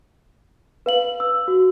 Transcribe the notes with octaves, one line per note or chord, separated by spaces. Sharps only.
B4 F5 F#7
E6
F#4